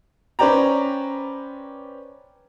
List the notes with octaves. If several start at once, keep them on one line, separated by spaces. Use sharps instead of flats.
C#4 B4 C5 D5 G5 A#5